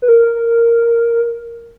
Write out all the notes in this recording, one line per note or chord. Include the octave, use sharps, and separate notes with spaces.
B4
A#4